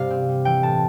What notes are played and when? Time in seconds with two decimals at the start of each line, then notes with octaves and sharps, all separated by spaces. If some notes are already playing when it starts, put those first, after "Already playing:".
Already playing: G2 C3 G3 F5
0.10 C4
0.29 G3
0.45 E3 G5
0.63 A2 A5